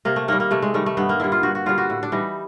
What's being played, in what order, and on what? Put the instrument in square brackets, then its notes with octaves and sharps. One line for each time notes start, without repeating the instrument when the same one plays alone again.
[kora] C3 A#3
A3
D#3 G3 A#3
A#3
C3 A3
G#3
D#3 G3 A3
A3
G2 B3
A#3
D3 G3 E4
F4
G2 F#4
F#4
D3 G3 F4
F#4
A2
D4
E3 G3 D#4